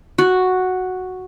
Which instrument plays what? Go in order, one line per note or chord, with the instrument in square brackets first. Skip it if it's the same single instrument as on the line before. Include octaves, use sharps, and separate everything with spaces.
[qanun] F#4